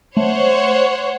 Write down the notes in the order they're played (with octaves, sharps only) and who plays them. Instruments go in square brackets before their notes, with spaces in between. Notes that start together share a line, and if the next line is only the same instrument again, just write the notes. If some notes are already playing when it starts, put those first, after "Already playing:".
[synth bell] A3 [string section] C5 C#5 F#5